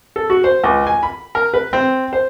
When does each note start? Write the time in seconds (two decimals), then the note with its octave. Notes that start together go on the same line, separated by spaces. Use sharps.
0.16 A4
0.30 F#4
0.44 C5
0.64 C#2
0.87 G#5
1.03 B5
1.35 A#4
1.54 B4
1.73 C4
2.13 C5